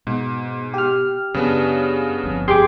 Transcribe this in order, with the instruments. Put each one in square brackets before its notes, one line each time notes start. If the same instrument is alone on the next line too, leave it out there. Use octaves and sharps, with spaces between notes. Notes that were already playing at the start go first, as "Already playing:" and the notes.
[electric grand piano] G#2 [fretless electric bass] B2
[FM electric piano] G4 F6
[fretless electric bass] F#2 [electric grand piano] C#3 B3 D4
[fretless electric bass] G1 F2
[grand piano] G4 G#4 [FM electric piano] C6 D6